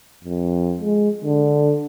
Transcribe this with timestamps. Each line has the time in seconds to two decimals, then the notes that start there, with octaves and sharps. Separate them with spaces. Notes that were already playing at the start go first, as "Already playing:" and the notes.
0.24 F2
0.80 G#3
1.25 D3